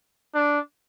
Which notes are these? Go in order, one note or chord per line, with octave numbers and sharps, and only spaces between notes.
D4